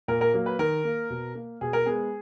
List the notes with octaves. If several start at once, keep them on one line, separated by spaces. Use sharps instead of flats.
A#2 A#4
A#4
F#3 A#3
B4
D#3 A#4
A#3
B2
A#3
B2 G#4
A#4
G#3 B3 G#4